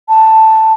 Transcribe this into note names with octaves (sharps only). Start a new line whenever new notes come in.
A5